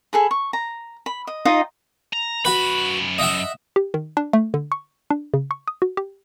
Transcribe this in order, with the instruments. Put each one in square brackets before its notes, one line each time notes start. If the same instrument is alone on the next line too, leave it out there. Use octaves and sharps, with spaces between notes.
[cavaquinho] G#4 A4 B5
C#6
A#5
B5
D#5
D#4 F4 D#5 G5
[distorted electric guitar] A#5
[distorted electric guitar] F#2 B5 [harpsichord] F#4 B4
[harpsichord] D#5 E5 F#5
[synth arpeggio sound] G4
D#3
D4
A3
D3
C#6
D4
C#3
C#6
D#6
F#4
G4